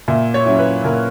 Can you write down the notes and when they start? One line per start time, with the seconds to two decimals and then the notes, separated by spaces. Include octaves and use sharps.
0.08 A#2 E5
0.34 C#5
0.46 F#3 C#4 E4
0.59 B4
0.84 A#2 A#4